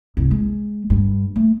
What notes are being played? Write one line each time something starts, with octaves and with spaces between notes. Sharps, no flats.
C2 G2
G#3
G2
A3